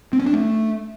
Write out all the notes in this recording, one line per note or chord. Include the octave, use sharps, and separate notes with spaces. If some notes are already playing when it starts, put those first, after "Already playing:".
C4
C#4
D4
A3